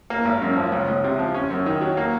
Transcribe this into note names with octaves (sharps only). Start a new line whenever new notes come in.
A#3
G#1
F#2
F3
C#2
C#2
C3
F3
C#4
F#2
D#3
F#3
A#3